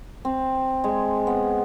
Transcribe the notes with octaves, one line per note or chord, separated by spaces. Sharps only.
C4
G#3
B3